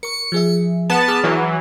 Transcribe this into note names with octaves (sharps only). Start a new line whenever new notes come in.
A#4 C#6 C#7
F3 G#4 E5
B3 A5
G#4 D6 F6
E3 F#3